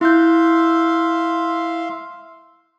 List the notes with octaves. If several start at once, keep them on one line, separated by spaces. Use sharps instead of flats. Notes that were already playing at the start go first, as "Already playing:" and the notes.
E4 E5 F5 C6 G6